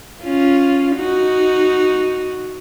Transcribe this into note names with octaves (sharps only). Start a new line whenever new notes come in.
C#4 F4
D#4 F#4